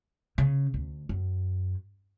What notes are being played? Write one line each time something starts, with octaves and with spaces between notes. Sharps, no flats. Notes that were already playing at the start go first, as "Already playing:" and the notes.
C#3
D2
F#2